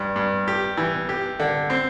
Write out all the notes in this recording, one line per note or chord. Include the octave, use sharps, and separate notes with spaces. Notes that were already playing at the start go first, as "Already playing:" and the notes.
Already playing: G2
G2
G4
E3
G4
D3
C4